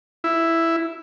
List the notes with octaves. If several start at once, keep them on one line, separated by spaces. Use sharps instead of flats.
E4